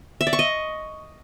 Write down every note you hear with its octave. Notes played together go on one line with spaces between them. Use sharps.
E5
D5
C#6
D#5